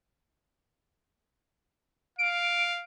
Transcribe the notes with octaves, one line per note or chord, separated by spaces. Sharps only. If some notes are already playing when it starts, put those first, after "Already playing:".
F5 D7